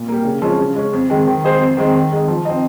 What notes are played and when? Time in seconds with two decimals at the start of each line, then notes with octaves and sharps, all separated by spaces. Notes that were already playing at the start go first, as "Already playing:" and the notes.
Already playing: A#2
0.08 G3 A#3
0.25 C#3
0.42 F3 G#3 C#4
0.59 C#3
0.76 G#3 C#4
0.93 F2
1.10 D#3 G#3 C4
1.27 D#3
1.44 G#3 D#4 G#4 C5
1.60 F2
1.77 D#3 G#3 C4 D#4
1.94 D#3
2.12 G#3 D#4
2.28 F3
2.45 C4 D#4